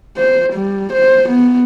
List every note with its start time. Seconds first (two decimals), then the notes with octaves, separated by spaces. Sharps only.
0.18 C5
0.53 G3
0.93 C5
1.29 B3